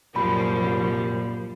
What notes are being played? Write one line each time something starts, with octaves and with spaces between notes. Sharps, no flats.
C2 F#2 A#2 F3 G3 B5